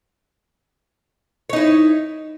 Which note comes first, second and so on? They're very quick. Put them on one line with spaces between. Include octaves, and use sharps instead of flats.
C#5 D#4 E4